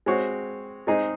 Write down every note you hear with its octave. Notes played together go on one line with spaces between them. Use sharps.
G#3 C4 F#4 C#5
G#3 C4 D#4 G#4 D#5